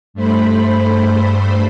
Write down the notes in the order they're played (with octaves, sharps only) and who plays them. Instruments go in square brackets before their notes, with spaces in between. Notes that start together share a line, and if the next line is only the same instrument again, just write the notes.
[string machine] G2 A3 C5 B5